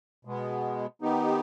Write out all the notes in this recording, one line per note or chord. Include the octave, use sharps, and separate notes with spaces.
B2 G#3 B3
D#3 B3 D#4 G4